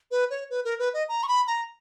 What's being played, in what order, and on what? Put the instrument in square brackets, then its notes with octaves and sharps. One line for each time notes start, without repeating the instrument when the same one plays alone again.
[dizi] B4
C#5
B4
A#4
B4
D#5
A#5
C#6
B5
A#5